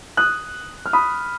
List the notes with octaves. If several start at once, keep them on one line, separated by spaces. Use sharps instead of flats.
D#6 F#6
F6
B5 D#6